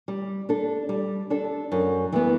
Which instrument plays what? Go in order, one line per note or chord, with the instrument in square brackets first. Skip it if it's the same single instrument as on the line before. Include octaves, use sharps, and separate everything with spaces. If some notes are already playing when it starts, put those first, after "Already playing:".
[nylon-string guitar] G3
D4 A4
G3
D4 A4
F#2
E3 G3 B3